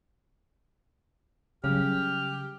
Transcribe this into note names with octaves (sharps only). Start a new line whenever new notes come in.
C#3 F#3 G3 G4 F6